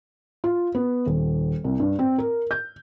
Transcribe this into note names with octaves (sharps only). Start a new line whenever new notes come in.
F4
B3
D#1
C2
G2
C4
A#4
G6